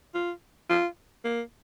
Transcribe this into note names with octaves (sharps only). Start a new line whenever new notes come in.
F4
F4
A#3